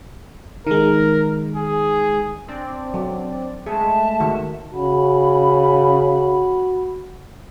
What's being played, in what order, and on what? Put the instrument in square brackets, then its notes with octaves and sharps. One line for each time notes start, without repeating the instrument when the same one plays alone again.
[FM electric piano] D#3 G#3 [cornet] A#4
[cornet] G#4
[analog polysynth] C4 D4 D5
[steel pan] F#3
[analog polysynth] G#3 A3 [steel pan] G#4 [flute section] E5 A5
[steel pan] D#3 F#4
[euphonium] C#3 [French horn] F#4 [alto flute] B5